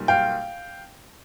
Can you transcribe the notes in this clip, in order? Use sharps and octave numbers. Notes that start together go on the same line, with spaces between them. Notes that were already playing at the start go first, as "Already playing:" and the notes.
Already playing: B1 A#2 G3
F5 G5